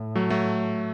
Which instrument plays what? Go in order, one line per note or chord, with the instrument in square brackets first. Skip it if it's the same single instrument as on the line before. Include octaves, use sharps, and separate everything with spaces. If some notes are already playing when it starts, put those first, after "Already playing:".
Already playing: [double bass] A2
[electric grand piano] F#3 A3
F#3 A3